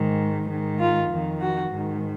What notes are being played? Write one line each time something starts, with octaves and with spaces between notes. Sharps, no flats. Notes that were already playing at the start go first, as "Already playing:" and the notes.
Already playing: G#2 D#3
G#2 D#3
F4
F2 D#3
F#4
G#2 D#3